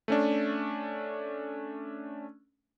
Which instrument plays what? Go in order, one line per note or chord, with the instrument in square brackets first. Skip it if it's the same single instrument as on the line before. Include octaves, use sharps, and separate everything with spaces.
[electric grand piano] A3 C#4 D4